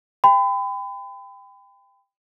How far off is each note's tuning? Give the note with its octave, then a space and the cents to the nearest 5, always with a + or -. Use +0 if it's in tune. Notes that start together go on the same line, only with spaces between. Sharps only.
G5 +20 B5 +35